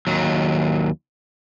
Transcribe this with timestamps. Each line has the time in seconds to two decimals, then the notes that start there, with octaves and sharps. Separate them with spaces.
0.07 D#2 F#3